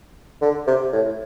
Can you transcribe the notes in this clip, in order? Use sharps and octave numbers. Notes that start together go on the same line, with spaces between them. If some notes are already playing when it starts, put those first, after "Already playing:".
D3
C3
A2